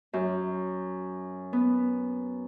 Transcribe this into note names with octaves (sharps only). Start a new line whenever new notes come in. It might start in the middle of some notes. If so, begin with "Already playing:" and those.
F#2
B3